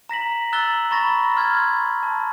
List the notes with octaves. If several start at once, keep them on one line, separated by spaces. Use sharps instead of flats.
A#5 A#6 B6 F#7
A#5 E6 F#6 A6 F#7 G7
A#5 B5 C#6 A6 A#6
C6 F6 G#6 A6
A5